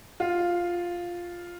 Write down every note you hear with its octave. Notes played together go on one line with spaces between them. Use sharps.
F4